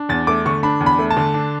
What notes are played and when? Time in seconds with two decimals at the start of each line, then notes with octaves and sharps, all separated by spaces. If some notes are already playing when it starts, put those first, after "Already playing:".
Already playing: D4
0.09 E2 A6
0.27 A3 D6
0.46 D3 C#6
0.63 D4 B5
0.80 E2
0.86 B5
0.99 A3
1.11 A5
1.17 D3
1.34 D4